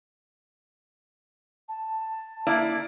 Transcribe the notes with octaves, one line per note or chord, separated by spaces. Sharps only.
A5
A#3 E4 D5